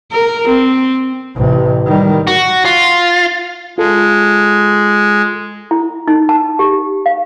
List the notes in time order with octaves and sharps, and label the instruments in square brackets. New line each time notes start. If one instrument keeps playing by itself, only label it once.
[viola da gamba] A#4
C4
[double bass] A1 C3
D#3 G3
[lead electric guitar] F#4
F4
[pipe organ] G#3 [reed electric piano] F4 A4
[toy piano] E4
D#4
A5
G4
F5